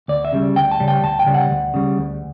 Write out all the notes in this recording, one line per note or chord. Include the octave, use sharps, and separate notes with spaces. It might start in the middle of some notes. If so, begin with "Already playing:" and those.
D2 D5
E5
C#3 G3
D2 G5
A5
C#3 G3
G5
D2 A5
G5
C#3 G3
F#5
D2
C#3 G3
D2